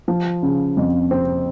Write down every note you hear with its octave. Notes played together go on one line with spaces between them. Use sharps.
F3
C#3
F2
C4